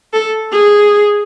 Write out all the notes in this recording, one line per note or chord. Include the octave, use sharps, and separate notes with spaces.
A4
G#4